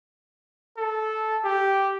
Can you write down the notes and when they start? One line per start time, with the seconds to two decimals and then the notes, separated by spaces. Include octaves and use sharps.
0.77 A4
1.44 G4